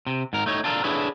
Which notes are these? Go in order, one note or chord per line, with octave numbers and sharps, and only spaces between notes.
C3
G#2 A#4
A3 D#4 C#5
D4 F4 A4 A#4
D4 E4 G#4 A4 B4 C#5